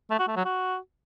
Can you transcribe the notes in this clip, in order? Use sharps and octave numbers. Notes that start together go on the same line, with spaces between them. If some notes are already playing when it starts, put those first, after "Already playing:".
A3
F#4
A3
F#3
F#4